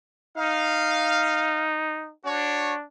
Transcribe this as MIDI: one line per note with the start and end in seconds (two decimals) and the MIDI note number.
0.37 2.13 63
0.37 1.66 77
2.25 2.85 62
2.25 2.74 66
2.25 2.74 73